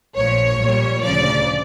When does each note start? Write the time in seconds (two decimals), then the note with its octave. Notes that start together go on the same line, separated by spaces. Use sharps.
0.15 A#1 A#2 F3 C#5
0.59 A#1 A#2 G3
1.02 D2 C#3 F3 D5